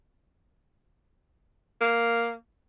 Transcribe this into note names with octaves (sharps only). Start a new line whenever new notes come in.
A#3